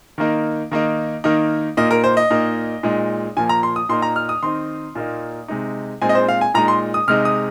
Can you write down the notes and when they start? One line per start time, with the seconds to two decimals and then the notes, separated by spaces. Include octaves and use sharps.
0.18 D#3 A#3 D#4
0.71 D#3 A#3 D#4
1.24 D#3 A#3 D#4
1.77 A#2 A#3 D#4 D#5
1.91 A#4
2.04 C5
2.17 D#5
2.30 A#2 A#3 D#4
2.83 A#2 G#3 D#4
3.37 A#2 F3 A#3 G#5
3.49 A#5
3.63 C6
3.76 D#6
3.89 A#2 A#3 D#4 C6
4.02 A#5
4.16 F6
4.29 D#6
4.43 D#3 C4 D#4 C6
4.95 A#2 A#3 D#4
5.48 C3 G#3 D#4
6.02 A#2 G#3 C4 D#4 G#5
6.09 D#5
6.15 C5
6.29 F5
6.41 G#5
6.54 A#2 G#3 D#4 A#5
6.68 C6
6.94 D#6
7.08 C3 G#3 D#4 F6
7.25 D#6